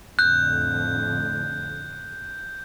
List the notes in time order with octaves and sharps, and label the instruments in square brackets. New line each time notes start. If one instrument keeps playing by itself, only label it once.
[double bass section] F2 A2 D3 [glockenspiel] F#6 [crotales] G6